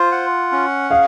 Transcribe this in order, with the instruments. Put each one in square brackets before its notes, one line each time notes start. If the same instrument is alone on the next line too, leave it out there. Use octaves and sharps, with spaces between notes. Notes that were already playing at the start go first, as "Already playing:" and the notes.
Already playing: [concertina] F4 C5
F#5
C#4
[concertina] G#4 [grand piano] F5